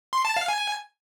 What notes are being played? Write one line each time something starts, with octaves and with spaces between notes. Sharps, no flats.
C6
A5
F5
G#5